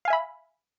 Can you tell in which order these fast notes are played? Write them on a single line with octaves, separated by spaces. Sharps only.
F5 G#5 E5 B5